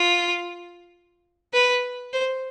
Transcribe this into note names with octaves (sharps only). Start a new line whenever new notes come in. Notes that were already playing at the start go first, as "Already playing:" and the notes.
Already playing: F4
B4
C5